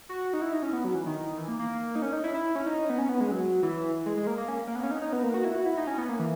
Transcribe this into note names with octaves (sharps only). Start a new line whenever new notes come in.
F#4
D#4
E4
D#4
C#4
B3
F#3
E3
D#3
E3
A#3
A#3
D#4
C#4
D#4
E4
E4
C#4
D#4
B3
C#4
B3
G#3
F#3
E3
G#3
G#3
A#3
A#3
C#4
A#3
B3
C#4
D#4
D#4
B3
A#3
F#4
E4
F#4
E4
D#4
C#4
B3
A#3
E3